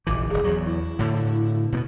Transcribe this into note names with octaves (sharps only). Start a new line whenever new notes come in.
F1 A#1 E3 D6
D1 G1 G#4
E2 F#3
E4
A2 D3
B2 A3 B3